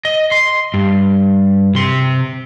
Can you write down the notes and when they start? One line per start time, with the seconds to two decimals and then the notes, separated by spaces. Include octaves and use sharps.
0.05 D#5
0.31 C6
0.74 G2
1.75 C3 C6